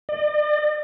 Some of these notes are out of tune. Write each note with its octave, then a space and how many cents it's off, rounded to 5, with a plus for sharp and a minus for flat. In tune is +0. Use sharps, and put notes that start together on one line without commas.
D5 +45